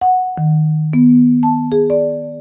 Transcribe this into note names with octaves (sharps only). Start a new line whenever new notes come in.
F#5
D#3
B3
A5
G#4
D5